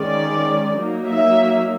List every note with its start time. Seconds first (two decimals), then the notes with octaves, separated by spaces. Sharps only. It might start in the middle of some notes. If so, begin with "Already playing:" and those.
Already playing: D#3 G#3 C#4 D5
0.78 F#3 A#3 D#4
1.07 E5